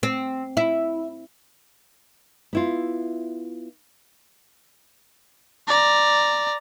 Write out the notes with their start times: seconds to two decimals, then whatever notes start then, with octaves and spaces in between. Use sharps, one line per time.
0.03 C4
0.57 E4
2.53 B3 E4 F4
5.67 D5 A#5